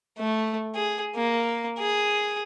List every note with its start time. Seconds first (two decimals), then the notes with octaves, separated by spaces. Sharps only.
0.18 A3
0.75 G#4
1.16 A#3
1.78 G#4